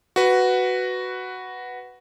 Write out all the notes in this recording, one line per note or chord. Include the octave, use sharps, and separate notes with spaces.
F#4 B4